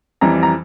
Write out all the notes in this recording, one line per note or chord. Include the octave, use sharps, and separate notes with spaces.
F2 E3 G3 A#5
A#5